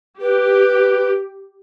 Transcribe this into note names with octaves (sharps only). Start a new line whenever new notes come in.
G4 B4